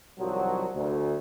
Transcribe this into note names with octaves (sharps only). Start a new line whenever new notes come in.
C2 D#3 F3 F#3
D2